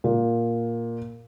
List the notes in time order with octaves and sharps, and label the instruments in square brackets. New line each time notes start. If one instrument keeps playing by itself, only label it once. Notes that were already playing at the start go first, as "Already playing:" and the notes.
[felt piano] A#2